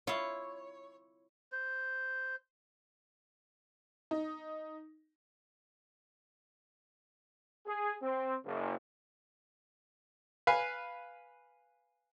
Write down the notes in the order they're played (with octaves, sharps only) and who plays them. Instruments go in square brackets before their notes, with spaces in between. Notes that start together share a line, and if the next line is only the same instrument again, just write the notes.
[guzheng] E4 F4 [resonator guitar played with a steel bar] C#5
[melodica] C5
[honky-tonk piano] D#4
[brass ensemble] G#4
C4
F#1
[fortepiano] B4 F5 G#5